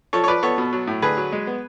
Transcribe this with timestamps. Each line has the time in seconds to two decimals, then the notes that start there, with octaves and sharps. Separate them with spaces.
0.13 F3 A4 C#5
0.24 C#5
0.28 F3 B4 D5
0.43 B3 A4 C#5
0.58 B2
0.73 F#3
0.87 A2
1.02 D3 G#4 B4
1.17 F#3
1.32 G#3
1.47 B3